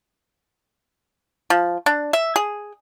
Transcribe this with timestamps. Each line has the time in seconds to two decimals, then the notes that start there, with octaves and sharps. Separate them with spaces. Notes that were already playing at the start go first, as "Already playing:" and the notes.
1.50 F3
1.86 D4
2.13 E5
2.36 G#4